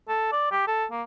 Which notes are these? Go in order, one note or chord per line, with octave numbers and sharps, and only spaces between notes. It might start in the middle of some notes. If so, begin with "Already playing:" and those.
A4
D5
G4
A4
A#3